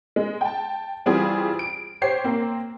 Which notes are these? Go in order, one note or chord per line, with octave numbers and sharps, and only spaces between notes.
G#3
G5 A5
E3 G3 C4 F4 G4 G#4
D7
G4 C5 C#5 C7
A#3 C4